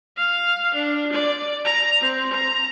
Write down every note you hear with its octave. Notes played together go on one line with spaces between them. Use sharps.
F5
D4
D5
A#5
C4
A#5